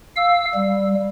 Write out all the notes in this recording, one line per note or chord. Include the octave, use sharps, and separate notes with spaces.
F5 E6
G3